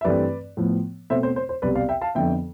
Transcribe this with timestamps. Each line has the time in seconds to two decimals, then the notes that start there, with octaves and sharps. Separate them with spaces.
0.01 E5
0.04 G2 E3 A3 C4 B4 D5
0.57 A2 F3 B3
1.10 B2 A3 C4 C5 E5
1.23 C5
1.36 C5
1.49 C5
1.62 C2 B2 G3 B4 D5
1.75 D5 F5
1.89 E5 G5
2.01 F5 A5
2.15 F2 D3 F3 B3 E5 G5